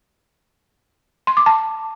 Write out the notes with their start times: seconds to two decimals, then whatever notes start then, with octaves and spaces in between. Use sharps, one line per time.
1.27 C6
1.37 D6
1.46 A5